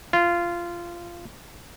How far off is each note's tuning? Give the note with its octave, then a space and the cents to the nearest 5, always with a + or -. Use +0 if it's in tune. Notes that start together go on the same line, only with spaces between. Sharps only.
F4 -15